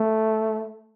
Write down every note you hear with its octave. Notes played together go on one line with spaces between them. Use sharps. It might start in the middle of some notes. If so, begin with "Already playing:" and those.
Already playing: A3